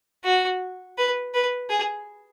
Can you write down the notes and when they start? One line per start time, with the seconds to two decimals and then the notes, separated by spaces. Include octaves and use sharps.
0.24 F#4
0.97 B4
1.34 B4
1.70 G#4